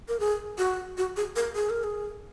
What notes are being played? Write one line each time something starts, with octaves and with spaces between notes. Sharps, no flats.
A#4
G#4
F#4
F#4
G#4
A#4
G#4
A#4
G#4